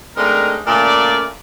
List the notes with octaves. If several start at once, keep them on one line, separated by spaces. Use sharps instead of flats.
G#3 A3 C4 D4 D#4 A#4
A#2 C#3 A3 A#4 D5